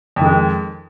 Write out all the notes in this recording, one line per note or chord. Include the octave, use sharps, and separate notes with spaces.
F2 D#3 G#3